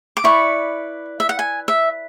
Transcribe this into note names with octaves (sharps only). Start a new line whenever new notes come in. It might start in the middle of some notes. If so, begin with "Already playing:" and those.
D6
E4 B4 D5 C#6
E5
F#5
G#5
E5